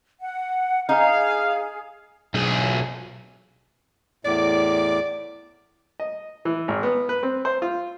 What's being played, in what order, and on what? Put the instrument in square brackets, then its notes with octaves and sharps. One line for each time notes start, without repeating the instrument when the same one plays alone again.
[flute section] F#5
[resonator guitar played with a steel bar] D#4 [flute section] G#4 [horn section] F5
[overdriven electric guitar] B1 G#4
[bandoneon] E2 A2 D6 [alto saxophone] D5
[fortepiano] D#5
E3
G#1
B3
B4
C4
C5
F4